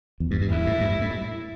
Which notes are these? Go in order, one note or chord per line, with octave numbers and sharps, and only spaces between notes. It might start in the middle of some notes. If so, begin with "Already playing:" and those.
E2
G2
G2
E2 E4
A2
G2
G2
A2